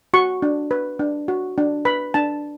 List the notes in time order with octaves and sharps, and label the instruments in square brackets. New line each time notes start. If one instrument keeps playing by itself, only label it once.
[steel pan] F#4 C#6
D4
B4
D4
F#4
D4
B4 B5
D4 A5